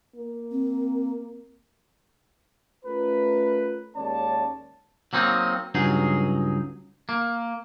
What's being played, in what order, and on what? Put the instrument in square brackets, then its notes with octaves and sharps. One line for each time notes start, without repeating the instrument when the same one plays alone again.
[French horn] A#3
[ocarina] C4
[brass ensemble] A3 C#4 F4 A#4 B4
D#2 G#3 C#4 C#5 D5 A5
[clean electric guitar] F#3 A#3 C4 D#4
C#2 G2 F#3 D#4 G#4
A#3